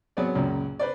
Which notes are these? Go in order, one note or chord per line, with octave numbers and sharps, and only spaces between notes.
F#3 B3 C4 G#4 C#5 D5
C#2 F#2 A#2
B4 C5 D5